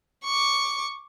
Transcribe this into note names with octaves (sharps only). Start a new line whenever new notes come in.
C#6 D6